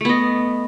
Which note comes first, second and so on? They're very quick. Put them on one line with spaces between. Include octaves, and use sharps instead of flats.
A3 B3 D#5